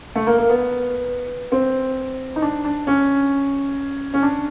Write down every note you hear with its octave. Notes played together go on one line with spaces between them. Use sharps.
A3
A#3
A#3
B3
C4
D#4
D4
D4
C#4
C#4
D4